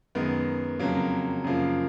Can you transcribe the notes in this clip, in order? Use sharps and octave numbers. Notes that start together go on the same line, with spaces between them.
F#2 D#3 G#3 B3
F2 C#3 F#3 A#3
F#2 C#3 F3 A#3